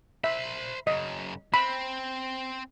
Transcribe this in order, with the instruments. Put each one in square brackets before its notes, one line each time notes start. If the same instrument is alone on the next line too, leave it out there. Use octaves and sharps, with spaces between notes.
[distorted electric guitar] C5 B5 [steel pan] E5
[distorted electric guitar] F#2 C#3 [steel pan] D#5
[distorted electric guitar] C4 [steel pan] B5